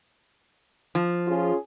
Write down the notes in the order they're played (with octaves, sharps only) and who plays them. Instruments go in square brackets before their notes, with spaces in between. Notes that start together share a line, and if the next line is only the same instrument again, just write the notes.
[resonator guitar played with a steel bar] F3
[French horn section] C#4 F4 G#4